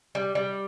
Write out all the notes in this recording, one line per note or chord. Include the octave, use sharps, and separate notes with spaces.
G3
G3